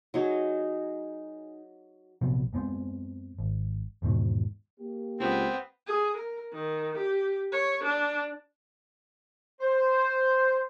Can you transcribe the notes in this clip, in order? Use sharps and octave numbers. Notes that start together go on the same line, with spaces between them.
F#3 D#4 G#4
A#1 C3 F#3 B3
F#2 G#3 B3 C4
G#1
E2 G#2 B2 D#3
A#3 G4
C#2 B3 C4
G#4
A#4
D#3
G4
C#5
D4
C5